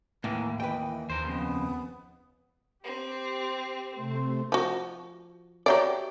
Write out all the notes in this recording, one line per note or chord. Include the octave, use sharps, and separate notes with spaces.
D#2 A2 E3 A#3 B4
B4 D#5 G5
D#2 A#4 C5
F2 C#3 B3
C4 G4
C3 A3 C5
F3 F#4
F#4 G4 C#5 D5 E5 A#5